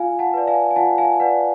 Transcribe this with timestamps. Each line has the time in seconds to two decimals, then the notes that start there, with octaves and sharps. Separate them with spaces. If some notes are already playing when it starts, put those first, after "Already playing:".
Already playing: F4 F5 G#5
0.19 F#5 A5
0.34 B4 D5
0.47 F5 G#5
0.71 G#5
0.76 F4 F#5 A5
0.98 F5 G#5
1.20 B4 D5 F#5